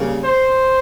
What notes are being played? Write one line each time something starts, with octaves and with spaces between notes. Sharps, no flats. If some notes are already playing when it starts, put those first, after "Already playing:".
Already playing: C#3 G3 A#3
C5